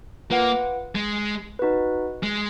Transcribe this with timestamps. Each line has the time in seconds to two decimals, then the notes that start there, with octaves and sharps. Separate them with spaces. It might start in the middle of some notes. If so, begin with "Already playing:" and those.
0.30 A#3 F4 B4 F#5
0.95 G#3
1.59 D#4 F#4 B4
2.23 G#3